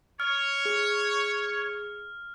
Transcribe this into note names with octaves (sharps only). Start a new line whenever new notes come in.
C#5 F6
G#4